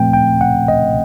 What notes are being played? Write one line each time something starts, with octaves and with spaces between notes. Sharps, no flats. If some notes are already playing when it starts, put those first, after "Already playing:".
Already playing: A#2 F3 A3 C4 G5
G5
F#5
D#5